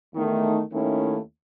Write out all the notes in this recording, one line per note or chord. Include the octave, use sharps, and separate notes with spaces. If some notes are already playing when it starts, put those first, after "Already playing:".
E2 D#3 A3 D#4
D#2 D#3 A3 C#4 E4